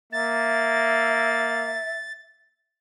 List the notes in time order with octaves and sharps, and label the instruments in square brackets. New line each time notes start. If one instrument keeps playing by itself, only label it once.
[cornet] A#3 [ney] E5 [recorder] A6